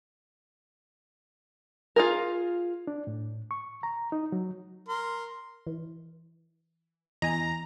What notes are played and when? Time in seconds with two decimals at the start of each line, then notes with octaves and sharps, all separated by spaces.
1.96 F4 G#4 A#4
2.87 D4
3.07 A2
3.51 C#6
3.83 A#5
4.12 D#4
4.32 F#3
4.89 A#4 C6
5.67 E3
7.22 E2 D#5 G#5 A#5